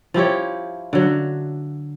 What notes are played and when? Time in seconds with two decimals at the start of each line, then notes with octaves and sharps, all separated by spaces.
0.14 F3 E4 G4 C#5
0.93 D3 F#3